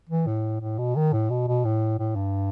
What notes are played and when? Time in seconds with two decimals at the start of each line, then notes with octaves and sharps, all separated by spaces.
0.09 E3
0.27 A2
0.61 A2
0.78 B2
0.96 D#3
1.13 A2
1.30 B2
1.48 B2
1.65 A2
1.99 A2
2.15 G2